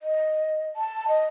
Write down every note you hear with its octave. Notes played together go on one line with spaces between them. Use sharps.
D#5
A5
D#5